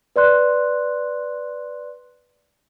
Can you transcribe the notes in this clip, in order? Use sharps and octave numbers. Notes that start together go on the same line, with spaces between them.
B4 D5 C6 F#6